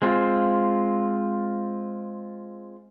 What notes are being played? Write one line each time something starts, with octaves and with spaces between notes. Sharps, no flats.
G#3 C4 F4